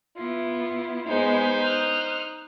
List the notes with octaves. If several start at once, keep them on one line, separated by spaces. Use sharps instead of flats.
B3 E4 F4
G#3 B3 D#4 C5
D#6 F6 F#6